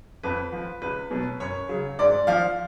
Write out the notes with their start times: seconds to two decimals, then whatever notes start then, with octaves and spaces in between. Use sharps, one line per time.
0.23 F2 B4
0.52 F3
0.82 C#2 B4
1.11 B2 F#3
1.40 F#2 C#5
1.69 C#3 F#3
1.99 G#2 D5
2.27 F3 F5